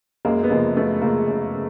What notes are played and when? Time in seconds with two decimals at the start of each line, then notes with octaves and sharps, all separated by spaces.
0.25 F#2 G#3 A#3
0.43 B3
0.50 C#3 F3 G#3 A#3
0.76 F#2 A3 B3
1.02 C#3 F3 G#3 A#3
1.27 F#2
1.54 C#3